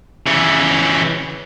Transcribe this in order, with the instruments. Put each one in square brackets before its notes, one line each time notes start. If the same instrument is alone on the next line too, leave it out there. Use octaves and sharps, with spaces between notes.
[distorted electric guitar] C#3 E3